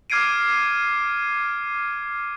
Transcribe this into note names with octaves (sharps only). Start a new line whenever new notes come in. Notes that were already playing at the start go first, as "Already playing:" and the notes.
D6 F6 G#6 C7 D7 D#7